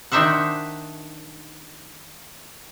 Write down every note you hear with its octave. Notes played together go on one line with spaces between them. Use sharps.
D#3 D4 D#4 C5 E5 F#5